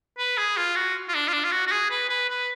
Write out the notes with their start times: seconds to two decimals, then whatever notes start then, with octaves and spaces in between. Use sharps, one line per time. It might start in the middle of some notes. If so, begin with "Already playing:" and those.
0.18 B4
0.37 G#4
0.57 F4
0.76 F#4
1.08 F4
1.15 D4
1.28 F4
1.33 D4
1.44 F4
1.52 F#4
1.67 F#4
1.72 G#4
1.90 B4
2.09 B4
2.29 B4